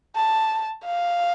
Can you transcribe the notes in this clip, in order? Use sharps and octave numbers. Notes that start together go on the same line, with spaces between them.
A5
F5